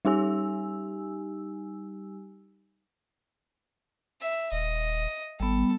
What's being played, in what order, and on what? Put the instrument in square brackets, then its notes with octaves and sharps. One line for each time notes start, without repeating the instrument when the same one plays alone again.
[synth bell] G3 D#4 G4 G#5 E6
[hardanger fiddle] E5
[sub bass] D#1 [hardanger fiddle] D#5
[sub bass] G#1 [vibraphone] G3 B3 [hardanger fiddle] A4